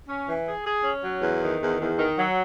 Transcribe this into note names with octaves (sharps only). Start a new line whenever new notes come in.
C#4
E3
G#4
G#4
C#4
F#3
E2
D#3
E2
E2
D#3
F#3